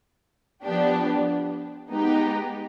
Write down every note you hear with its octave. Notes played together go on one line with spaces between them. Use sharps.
F3 B3 D4 G4
G#3 B3 D#4 G4